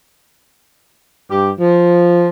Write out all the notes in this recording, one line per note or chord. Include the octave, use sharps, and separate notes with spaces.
G2 G4
F3